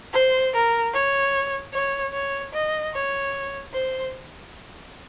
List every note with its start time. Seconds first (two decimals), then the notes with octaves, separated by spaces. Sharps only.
0.13 C5
0.54 A#4
0.94 C#5
1.73 C#5
2.14 C#5
2.54 D#5
2.94 C#5
3.73 C5